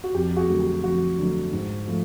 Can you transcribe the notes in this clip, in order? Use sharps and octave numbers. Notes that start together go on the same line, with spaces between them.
F#4
F2 G4
F#4 G#4
D3 F#3 A3
G4
F2 F#4
D3 F#3 A3
G#2
F3 A3